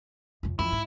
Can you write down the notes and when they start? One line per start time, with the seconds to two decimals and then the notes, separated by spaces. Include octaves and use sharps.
0.43 F2 C#3
0.59 F2 E3 E4
0.72 G#2